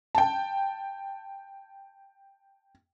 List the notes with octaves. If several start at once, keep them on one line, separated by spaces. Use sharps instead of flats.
G5 A5